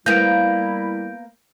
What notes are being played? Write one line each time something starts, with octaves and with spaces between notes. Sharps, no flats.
G3 A#3 B3 E4 G6 D7